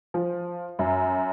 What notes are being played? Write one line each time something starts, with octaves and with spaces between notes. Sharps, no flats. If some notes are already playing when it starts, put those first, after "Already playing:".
F3
F#2